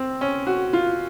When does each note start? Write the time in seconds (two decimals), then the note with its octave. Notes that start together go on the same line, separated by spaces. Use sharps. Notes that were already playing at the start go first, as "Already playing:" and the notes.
Already playing: C4
0.21 C#4
0.47 F#4
0.73 F4